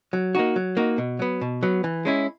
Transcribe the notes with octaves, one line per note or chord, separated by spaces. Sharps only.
F#3
A#3 D#4 F#4
F#3
A#3 D#4 F#4
B2
F#3 B3
B2
F#3 B3
E3
G#3 C#4 E4